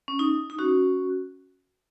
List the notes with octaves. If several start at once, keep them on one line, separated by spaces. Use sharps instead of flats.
C#4
D#4
D#4
C#4 F#4